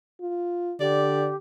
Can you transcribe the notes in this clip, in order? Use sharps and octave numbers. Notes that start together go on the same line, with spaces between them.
F4
D3 G4 D5